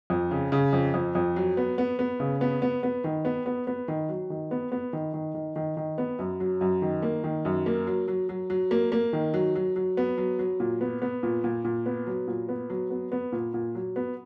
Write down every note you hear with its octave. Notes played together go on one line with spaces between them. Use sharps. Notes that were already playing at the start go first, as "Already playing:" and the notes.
F2
C#3
C#3
F2
F2
F2
F#3
B3
B3
B3
C#3
B3
B3
B3
D#3
B3
B3
B3
D#3
F#3
D#3
B3
B3
D#3
D#3
D#3
D#3
D#3
B3
F#2
F#3
F#2
D#3
A#3
D#3
F#2
A#3
F#3
F#3
F#3
F#3
A#3
A#3
D#3
F#3
F#3
F#3
B3
F#3
F#3
A#2
B3
B3
A#2
A#2
A#2
B3
F#3
A#2
B3
F#3
B3
B3
A#2
A#2
F#3
B3